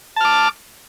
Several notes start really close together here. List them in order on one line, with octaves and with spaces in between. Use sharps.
A5 F6 D6